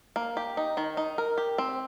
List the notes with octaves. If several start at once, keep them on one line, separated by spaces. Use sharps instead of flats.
A#3
G4
D#4
D#3
D#4
A#4
G4
C4